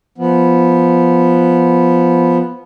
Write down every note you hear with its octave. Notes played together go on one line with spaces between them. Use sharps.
F3 B3